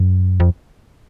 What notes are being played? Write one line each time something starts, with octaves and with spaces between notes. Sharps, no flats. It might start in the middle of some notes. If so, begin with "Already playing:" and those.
Already playing: F#2
F2